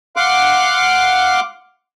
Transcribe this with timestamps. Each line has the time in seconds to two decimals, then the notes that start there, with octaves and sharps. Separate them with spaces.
0.16 F5 F#5 C6 D6